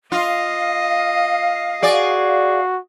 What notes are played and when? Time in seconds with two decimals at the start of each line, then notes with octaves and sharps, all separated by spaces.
0.12 F4 D#5 F5
1.82 F#4 G#4 D5